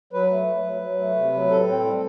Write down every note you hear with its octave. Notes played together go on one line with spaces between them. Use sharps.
F#3 B4
A3
F#3
F#3
F#3
A3
C3
F#3
A2 A4
C4
G3